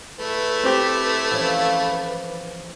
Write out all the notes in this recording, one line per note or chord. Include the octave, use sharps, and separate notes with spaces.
A3 E4 B4
C4 G4
E3 F3 C#4